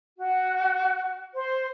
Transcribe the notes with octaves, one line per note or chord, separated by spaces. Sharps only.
F#4
C5